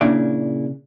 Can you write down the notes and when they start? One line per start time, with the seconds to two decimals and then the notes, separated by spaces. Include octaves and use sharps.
0.01 A#2 C#3 D4 E4 D5